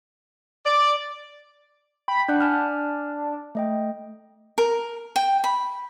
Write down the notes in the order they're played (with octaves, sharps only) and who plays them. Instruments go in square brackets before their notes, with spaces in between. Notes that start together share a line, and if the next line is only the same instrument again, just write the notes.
[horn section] D5
[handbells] G5 [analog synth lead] B5
[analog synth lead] D4 [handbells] F#5 F#6 G6
[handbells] G#5 A5 F6
A3 D#5 G5
[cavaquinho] A#4
G5
B5